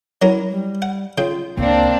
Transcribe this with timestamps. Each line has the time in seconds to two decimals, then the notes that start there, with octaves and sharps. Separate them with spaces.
0.22 F#3 C#4 E4 A#4
0.50 G3
0.82 F#5
1.18 C#3 F4 G5
1.57 C#2 A#3 C4 D4